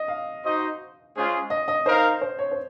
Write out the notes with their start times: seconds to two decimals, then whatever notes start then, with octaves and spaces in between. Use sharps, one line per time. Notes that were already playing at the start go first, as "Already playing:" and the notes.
Already playing: D#5
0.08 F5
0.43 D#4 F#4 C5 D#5
1.15 G#3 C#4 F4 G#4 C5
1.50 D#5
1.68 D#5
1.86 D#4 A#4 C5 F5
2.21 C5
2.39 C#5
2.51 C5